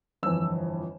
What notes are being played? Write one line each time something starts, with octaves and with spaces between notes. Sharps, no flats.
G1 F2 E3 E6